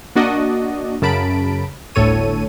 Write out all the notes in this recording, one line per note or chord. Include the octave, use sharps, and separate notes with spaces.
A#3 D4 F#4 D5 D#5
F#2 C#3 A#4 A5 B5 D7
G1 D2 A2 A4 C#5 D#7